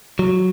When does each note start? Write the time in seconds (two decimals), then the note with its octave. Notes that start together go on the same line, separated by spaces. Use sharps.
0.19 F#3